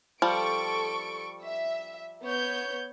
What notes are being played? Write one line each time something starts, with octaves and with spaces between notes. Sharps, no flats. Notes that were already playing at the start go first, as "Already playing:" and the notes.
F3 G3 A4 C#6 D7
E5
B3 C#5 G6